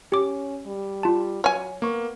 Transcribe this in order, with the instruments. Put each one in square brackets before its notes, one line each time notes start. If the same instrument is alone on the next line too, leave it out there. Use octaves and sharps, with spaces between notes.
[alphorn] C#4 [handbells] G4 D6
[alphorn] G3
[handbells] F4 A5
[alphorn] F#3 [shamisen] C#5 G#5
[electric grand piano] A#3 C#6 [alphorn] B3